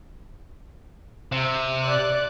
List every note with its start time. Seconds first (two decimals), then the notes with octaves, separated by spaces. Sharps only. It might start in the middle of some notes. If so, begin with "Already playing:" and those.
1.32 C3
1.80 D5 D6 F#6